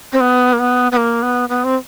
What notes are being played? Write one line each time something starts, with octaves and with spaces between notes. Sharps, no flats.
C4
B3
A#3
B3
B3
A#3
B3
B3
C4